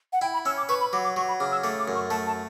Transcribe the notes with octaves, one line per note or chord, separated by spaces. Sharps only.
F#5
E4 G5
B5
C#4 E6
D6
B4 C#6
B5
F#3 D6
D6
F#3 C#6
B5
C#3 D6
E6
A3 D6
D6
F#2
C#6
A3 A5
A5